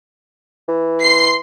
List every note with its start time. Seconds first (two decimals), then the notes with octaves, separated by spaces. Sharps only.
0.69 E3
1.01 C6 C7